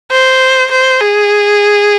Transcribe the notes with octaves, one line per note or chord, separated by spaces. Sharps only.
C5
C5
G#4